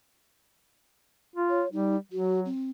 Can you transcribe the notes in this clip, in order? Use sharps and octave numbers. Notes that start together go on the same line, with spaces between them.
F4
C#5
G3 D#4
F#3 F#4
C4